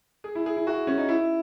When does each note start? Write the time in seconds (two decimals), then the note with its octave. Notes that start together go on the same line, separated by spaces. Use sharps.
0.24 G#4
0.35 E4
0.46 G#4
0.57 E4
0.67 F#4
0.87 C#4
0.98 D#4
1.09 E4